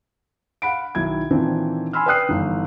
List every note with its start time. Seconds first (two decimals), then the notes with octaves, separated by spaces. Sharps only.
0.62 F5 F#5 B5 D7
0.95 B1 D#3 E4 G#6
1.30 A#2 D#3 E3 C4 D4
1.93 G#5 B5 C6 E6 F6
2.06 B4 D5 G5 D#6 F#6 C7
2.29 G1 D#3 E3